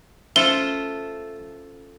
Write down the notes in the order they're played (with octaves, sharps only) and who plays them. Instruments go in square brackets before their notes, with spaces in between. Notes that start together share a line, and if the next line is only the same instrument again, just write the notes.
[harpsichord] A3 [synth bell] C#4 C5 E7 [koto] F4 A4 [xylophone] G7